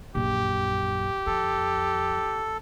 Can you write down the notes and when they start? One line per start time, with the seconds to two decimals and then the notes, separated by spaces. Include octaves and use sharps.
0.15 A#1 F#2 G4
1.27 F2 A4